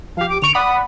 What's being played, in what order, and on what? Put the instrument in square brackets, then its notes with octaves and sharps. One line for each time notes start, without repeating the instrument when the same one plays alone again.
[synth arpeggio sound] F3 G4 [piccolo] F5
[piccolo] D6
[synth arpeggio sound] D3 C#6 D7 [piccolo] F7
[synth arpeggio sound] D5 F#5 B5 [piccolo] D#6